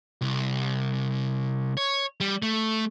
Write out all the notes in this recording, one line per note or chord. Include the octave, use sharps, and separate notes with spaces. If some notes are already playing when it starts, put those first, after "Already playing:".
C2
C#5
G3
A3